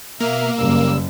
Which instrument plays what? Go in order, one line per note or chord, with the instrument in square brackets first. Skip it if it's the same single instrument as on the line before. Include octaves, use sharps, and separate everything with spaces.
[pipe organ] B2 E5 F6 [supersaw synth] A#3
[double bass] F#1 [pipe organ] C#3 G3 E6